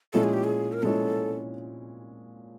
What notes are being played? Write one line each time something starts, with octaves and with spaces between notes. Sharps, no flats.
A#2 F3 G#3 C#4 E4 A4
G#4
G4
G#4
A#4
A#2 F3 G#3 C#4 E4 A4